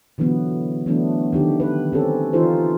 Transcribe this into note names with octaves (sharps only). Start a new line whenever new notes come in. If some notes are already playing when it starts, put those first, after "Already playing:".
B2 D3 E3 F#3 B3
E3 F#3 A3 B3 D4
D3 D#3 G4
B4
C4 C#4 G4 A4
E3 D#4 F4 A4 C5